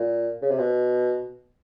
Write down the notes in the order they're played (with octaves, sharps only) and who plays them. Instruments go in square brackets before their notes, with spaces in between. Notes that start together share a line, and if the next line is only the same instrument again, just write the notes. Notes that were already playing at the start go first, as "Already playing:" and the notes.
Already playing: [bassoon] A#2
C#3
C3
B2